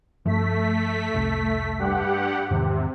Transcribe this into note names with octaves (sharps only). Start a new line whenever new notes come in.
G2 F3 A3 B6
F1 C2
G2 G4 F#5
E2 G#2 C3 D#3